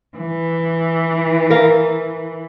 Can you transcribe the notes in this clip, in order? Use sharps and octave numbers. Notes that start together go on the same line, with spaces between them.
E3
A#4 F5